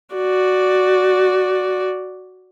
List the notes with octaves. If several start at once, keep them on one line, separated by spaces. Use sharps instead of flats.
F#4 D5